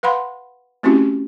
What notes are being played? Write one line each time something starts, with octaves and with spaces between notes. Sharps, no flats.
B4 F5 F#5 B5 C6
A3 C4 C#4 E4 F#4 G4